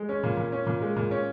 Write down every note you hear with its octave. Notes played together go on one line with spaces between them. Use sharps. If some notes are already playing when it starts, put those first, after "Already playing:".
Already playing: G#3
C#4
A#2
A#2
C#4
A#2
G#3
A#2
C#4